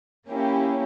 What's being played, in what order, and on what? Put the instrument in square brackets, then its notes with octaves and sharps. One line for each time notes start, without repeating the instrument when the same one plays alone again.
[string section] A#3 C#4 E4 G4